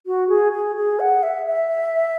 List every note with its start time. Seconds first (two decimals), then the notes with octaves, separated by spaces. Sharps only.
0.07 F#4
0.29 G#4
0.52 G#4
0.76 G#4
1.00 F#5
1.23 E5
1.46 E5